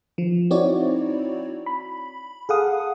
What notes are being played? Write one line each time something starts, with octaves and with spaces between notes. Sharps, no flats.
F3
C4 D#4 E4 F#4 C#5 D5
B5
G#4 A4 F5 F#5 D#6